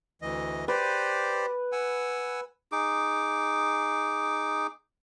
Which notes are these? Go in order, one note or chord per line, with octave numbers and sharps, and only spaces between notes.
D2 E3 D#5
G4 B4 C5 D5
F#5 G#5 E6
D#4 G#4 D6